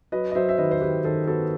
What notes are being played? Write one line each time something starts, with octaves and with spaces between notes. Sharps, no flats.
F#3 B4 D#5
D#5
F#3 C5 E5
E5
D#3 B4 D#5
C5
D#3 G4 B4
D#3 A4 C5
B3 F#4 A4